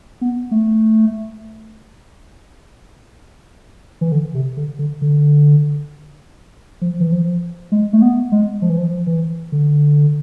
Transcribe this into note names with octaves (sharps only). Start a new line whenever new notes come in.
B3
A3
E3
D3
C3
D3
D3
D3
F3
E3
F3
G#3
A3
B3
G#3
F3
E3
F3
E3
D3